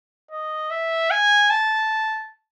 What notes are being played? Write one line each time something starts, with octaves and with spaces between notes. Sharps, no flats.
D#5
E5
G#5
A5